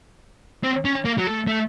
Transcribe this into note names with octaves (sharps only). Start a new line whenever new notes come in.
C4
C#4
A#3
F#3
A3
A3